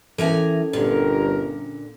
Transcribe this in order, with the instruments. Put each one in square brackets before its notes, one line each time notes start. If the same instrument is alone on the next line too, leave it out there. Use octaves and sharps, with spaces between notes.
[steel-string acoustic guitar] E3 A#4 G#5 [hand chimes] C#4 A4
[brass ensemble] G1 A#4 [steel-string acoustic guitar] A#2 D3